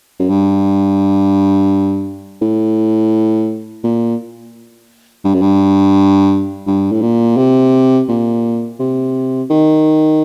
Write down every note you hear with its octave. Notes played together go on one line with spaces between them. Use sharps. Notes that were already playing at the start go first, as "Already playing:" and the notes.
F#2
G2
A2
A#2
G2
F#2
G2
G2
A2
A#2
C3
A#2
C3
D#3